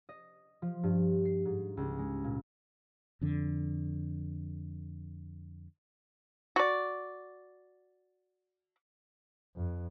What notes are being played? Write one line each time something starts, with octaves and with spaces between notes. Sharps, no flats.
D#5
F3
G2
C7
G#2
C#2
G#3
A#2
F2 D3
F#4 D5
F2